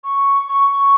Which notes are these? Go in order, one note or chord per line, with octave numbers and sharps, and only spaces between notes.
C#6
C#6